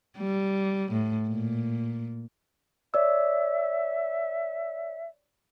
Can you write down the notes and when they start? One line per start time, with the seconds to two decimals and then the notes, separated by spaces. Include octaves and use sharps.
0.18 G3
0.92 A2
1.28 A#2
2.94 C#5 D5 E5 E6